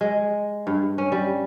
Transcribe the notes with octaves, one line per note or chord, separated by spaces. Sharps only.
G#3
G2
C#4
G3